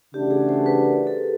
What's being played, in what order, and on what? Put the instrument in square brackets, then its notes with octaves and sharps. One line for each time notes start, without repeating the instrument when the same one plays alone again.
[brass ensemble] C#3 E3 A3 D4 F#4 [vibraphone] G4
[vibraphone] G#4
C5
B4
A#4
A4